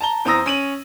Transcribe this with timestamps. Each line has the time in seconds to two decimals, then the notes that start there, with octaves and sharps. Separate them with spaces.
0.01 A5 A#5 G7
0.25 E2 C4 A#5 D#6 E6 A#6
0.46 C#4 D#7 F#7